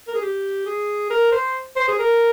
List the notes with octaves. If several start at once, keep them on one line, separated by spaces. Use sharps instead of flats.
A#4
G#4
G4
G#4
A#4
C5
C5
G#4
A#4